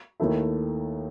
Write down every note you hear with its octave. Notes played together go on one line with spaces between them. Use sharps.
D#2 D#3 A3 E4